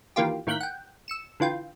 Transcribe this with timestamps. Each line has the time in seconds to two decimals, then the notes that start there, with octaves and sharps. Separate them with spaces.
0.16 D#3 E3 A#3 F4 G4
0.47 A2 D#3 A#3 F#6 G6 B6
0.61 F#5 G5
1.08 E6 C#7 E7
1.40 D3 E3 F4 G5